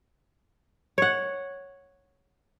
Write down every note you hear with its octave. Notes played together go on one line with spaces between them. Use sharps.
C#5 F#5